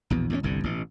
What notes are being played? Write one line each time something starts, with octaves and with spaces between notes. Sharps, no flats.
A#1 E2 B2
E2 A2 D#3 C#4
G1 C2 G2 D3
A1 B2